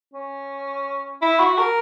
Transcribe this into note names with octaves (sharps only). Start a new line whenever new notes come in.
C#4
E4
F#4
A#4